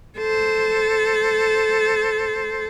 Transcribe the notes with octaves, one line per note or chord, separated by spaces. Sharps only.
A4 C5